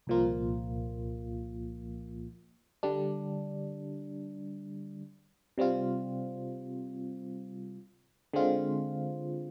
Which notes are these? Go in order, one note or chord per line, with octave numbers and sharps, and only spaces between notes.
C2 A#2 F3 A#3 F4
D3 G3 D4
C3 G3 C4 F4
D3 G#3 C4 F4